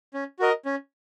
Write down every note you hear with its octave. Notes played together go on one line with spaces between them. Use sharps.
C#4
F#4 A#4 D#5
C#4